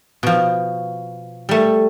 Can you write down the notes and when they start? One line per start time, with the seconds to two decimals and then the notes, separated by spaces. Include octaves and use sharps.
0.23 B2 F3
1.49 G3 A3